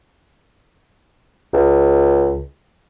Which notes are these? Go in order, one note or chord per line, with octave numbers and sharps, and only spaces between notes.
C#2